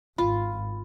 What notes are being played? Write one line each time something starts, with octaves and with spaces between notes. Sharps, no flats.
G#1 F4 B5